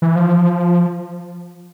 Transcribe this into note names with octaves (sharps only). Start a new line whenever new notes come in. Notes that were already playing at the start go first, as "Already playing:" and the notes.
E3
F3